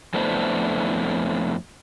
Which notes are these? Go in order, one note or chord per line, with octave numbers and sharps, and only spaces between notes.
F2 A3 B3 D4 E4 C5